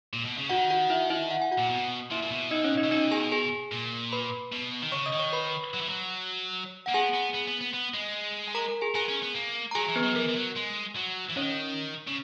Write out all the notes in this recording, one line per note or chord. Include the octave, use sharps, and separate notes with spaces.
A#2
B2
C#3
D#3 F#4 F#5
F#4 F#5
E4 E5
E4 E5
F#5
G#5
F#4 F#5
A#2
B2
A#2 E4 E5
A#2
B2
D#4 D#5
C#4 C#5
D#4 D#5
C#3
B2 D#4 D#5
G#4 G#5
G#4 G#5
A#2
B4 B5
B2
D#3
C#3 C#5 C#6
D#5 D#6
D#3
C#5 C#6
B4 B5
F#3
E3
F#3
A#3 F#5
B3 G#4 G#5
B3
B3
B3
B3
B3
G#3
G#5
A#4 A#5
A#4 A#5
G#4 G#5
B3 G#4 G#5
C#4
B3
A#3
A#5
F#3 G#4 G#5
E3
B3 B4
F#3
E3 A#4
E3
F#3
G#3
F#3
E3
D#3 C#4 C#5
C#3